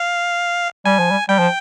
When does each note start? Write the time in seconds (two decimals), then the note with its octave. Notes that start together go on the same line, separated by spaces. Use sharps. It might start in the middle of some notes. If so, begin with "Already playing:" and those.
Already playing: F5
0.85 G3 G#5
0.99 F3
1.11 G3
1.29 G3 G5
1.39 F3